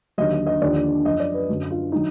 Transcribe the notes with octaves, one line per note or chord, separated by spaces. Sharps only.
D#2 D3 F#3 D#5
D#5
D#5
D#2 D3 F3 D5
F#2 F3 D#5
D5
B4
F#2 D3 F#3
F4
D#3 F#3 D#4